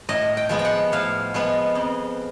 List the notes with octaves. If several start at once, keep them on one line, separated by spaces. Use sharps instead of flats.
A2 D#5
G5
F3 G#3 B3
G5
F#5
A2 F5
F3 G#3 B3
F2